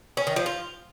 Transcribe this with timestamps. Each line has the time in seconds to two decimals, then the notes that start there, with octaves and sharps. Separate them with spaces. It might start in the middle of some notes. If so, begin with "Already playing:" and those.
0.17 C#4
0.27 D#3
0.36 F3
0.46 F4